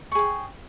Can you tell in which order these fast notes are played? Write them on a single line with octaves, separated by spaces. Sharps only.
C#6 G#4 G5